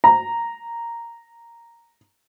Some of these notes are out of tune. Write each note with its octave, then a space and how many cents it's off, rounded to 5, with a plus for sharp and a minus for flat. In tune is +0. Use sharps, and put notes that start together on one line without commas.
A#5 -5